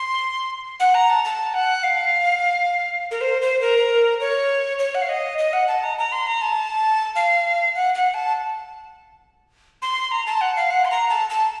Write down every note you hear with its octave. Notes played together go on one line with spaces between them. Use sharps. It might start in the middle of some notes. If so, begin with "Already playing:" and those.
Already playing: C6
F#5
A#5
A5
A5
F#5
F5
A#4
C5
C5
A#4
C#5
C#5
F#5
F5
D#5
D#5
F#5
A5
A#5
A#5
C6
A#5
A5
F5
F#5
F#5
A5
C6
A#5
A5
F#5
F5
F#5
C6
A#5
A5
A5